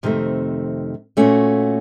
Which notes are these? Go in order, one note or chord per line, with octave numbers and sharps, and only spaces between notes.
F2 C3 D#3 A3
A#2 A3 C#4 F#4